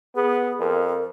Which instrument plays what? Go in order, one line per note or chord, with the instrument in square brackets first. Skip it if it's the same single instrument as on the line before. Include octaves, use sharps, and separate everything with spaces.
[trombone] B3 [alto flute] G#4
[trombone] F2 [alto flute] A#4